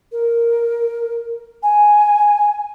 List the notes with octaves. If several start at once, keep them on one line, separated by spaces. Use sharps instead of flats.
A#4
G#5